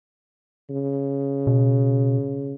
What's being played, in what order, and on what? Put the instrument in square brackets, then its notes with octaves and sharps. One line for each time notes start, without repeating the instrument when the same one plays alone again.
[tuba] C#3
[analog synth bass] B2